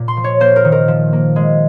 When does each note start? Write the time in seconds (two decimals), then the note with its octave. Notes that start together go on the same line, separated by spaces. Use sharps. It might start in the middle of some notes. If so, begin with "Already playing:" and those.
Already playing: A#2
0.08 C6
0.17 F3
0.24 C#5
0.40 A#3 C5
0.56 A#4
0.65 D#3
0.72 A#4
0.88 F3
1.13 A#3
1.36 G#3